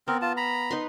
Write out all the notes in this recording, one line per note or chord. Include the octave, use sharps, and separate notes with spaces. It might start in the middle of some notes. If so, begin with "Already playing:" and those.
B3 C4 A#4
F4 A5
A#5 B5
D#4 B4 C6